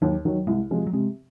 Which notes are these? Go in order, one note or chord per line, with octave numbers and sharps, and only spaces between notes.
D#2 F#3
D#3 F#3
C2 G#3
C3 F3 G#3
F#3
C3 G#3